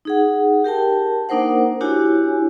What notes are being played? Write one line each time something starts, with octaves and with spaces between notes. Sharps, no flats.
D#4 G#4 F#5
G4 A#4 G5 A5
A#3 D4 D#4 A#4 C5 F#5
D4 E4 F#4 G4 C#5 G#5